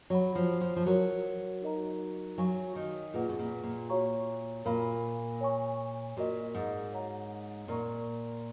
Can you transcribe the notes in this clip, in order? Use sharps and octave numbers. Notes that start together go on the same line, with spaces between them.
F#3 C#5 F#5 B5
F3
F3
F3
F#3 F#4 A#4 C#5
D#4 F#4 A#4 D#5 A#5
F#3 C#5 F5 G#5 C#6
D#3
A#2 F4 G#4 B4 D#5 F#5
B2
A#2
A#2
F#4 C#5 F5 A#5 C#6
A#2 A#4 F5 B5
C#5 G#5 C#6
A#2 F#4 A#4 D#5
G#2
C#5 F#5 A#5
A#2 A#4 D#5 A#5 C#6